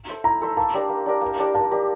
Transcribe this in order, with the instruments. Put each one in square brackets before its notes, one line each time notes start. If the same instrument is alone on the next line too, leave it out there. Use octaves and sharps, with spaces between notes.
[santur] A4 C5 E5
[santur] E4 [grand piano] A#5
[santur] A4 C5 E5
[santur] A#3 [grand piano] A5
[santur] D4 G4 A#4
A#3
D4 G4 A#4
A#3
D4 G4 A#4
[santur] A#3 [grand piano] A5
[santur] D4 G4 A#4